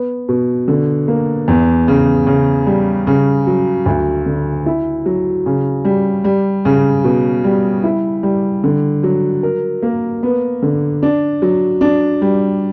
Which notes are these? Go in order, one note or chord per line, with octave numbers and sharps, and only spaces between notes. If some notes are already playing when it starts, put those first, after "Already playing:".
Already playing: B3
B2
D3
A#3
E2
C#3
C#3
G3
C#3
F#3
D2
D3
E4
F#3
C#3
G3
G3
C#3
B2
G3
E4
G3
D3
F#3
A#4
A#3
B3
D3
D4
F#3
D4
G3